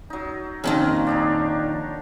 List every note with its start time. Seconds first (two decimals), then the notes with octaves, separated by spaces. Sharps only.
0.10 F#3 D#4
0.64 F2 A#2 D#3 C#4 A#4
1.07 D4 D#4 C#5